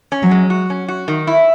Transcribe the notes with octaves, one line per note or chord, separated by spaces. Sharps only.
C#4
F#3
G#3
F#4
C#4
F#4
D#3
E4